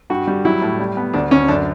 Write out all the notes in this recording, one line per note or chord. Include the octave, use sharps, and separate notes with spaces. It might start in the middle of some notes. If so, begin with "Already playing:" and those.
G2 F#4
G3
F#3 E4
A2
G3
B3
D2 D4
D2 C#4
F#2 D4